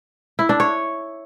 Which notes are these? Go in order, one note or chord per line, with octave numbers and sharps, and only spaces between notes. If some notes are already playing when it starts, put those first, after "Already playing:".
E4
D4
C#5